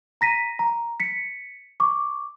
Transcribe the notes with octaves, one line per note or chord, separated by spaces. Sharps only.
A#5 A#6 B6 D#7
A#5
B6 C#7
C#6 D6